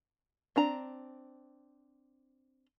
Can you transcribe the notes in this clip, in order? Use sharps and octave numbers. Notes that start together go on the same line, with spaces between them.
C4 D4 A#5